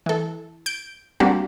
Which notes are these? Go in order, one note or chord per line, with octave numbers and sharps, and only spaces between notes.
E3 A4
G6 D7
G3 A#3 C4 D4 F#4 G4